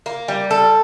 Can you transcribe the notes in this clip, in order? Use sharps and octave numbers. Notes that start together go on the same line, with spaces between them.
A#3
G3
A4